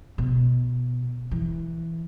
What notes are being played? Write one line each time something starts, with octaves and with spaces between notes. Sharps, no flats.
B2
E3